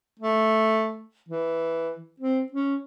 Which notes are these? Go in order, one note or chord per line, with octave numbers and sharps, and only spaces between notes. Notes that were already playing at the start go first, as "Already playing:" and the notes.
A3
E3
C4
C#4